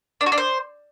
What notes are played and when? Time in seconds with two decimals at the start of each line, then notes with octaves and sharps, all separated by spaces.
0.21 D4
0.26 F#4
0.32 D4
0.38 C5